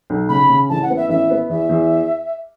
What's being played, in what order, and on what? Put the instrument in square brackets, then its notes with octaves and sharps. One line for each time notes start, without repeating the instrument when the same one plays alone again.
[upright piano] B1
[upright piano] C#3 [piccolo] B5
[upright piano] C#3
[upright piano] A1 [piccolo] A5
[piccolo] F#5
[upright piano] B3
[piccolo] E5
[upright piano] A1 [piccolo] E5
[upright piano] B3
[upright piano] E2 [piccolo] E5
[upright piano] E2